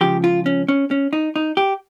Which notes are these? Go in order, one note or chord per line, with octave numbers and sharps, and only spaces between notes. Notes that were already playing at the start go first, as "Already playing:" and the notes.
C#2 C#3 F3 G4
F4
C#4
C#4
C#4
D#4
D#4
G4